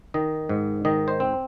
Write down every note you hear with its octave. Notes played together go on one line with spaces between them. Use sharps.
D#3 D#5
G#2
D#3 D#5
C5
C4